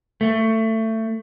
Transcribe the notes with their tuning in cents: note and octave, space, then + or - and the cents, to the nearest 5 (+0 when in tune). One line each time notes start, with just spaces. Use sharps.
A3 +20